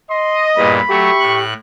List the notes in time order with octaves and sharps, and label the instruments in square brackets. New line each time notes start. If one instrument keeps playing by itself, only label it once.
[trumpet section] D#5 [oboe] C6
[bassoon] E2 [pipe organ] G2 A#2 [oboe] B5
[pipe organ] F#3 A3 [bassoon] G4 [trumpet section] E5 C#6
[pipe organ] A2 F#6